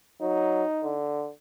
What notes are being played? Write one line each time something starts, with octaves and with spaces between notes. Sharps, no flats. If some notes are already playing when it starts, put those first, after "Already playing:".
F#3 D#4
D3